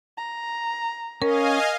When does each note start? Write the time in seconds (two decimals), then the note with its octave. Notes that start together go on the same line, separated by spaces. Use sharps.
0.17 A#5
1.22 C#4 A#4 D#5 F5 G#5